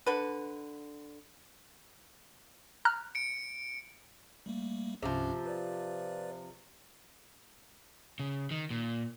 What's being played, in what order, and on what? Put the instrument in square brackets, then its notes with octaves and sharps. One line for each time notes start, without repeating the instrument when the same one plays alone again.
[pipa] D3 B4
[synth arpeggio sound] A#5 F6 F#6
[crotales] C#7 D7
[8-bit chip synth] G3 A3 A#3
[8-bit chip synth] C2 G2 C#4 [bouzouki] C3 F3
[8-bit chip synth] B4 D5
[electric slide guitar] C#3
D#3
A#2